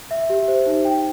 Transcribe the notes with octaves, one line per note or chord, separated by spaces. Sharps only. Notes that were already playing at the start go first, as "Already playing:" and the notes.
E5
G4
C5
D#4
G5